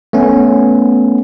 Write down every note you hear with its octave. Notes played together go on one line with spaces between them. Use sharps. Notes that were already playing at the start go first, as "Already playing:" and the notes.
A3 B3 C#4